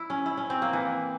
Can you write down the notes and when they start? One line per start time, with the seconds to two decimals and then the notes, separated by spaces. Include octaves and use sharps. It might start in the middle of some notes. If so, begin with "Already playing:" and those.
Already playing: E4
0.10 C#4
0.26 E4
0.37 C#4
0.50 C4
0.62 A#3
0.73 E3